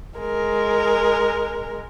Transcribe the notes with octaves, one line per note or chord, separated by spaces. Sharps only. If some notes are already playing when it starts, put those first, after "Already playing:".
G#3 A#4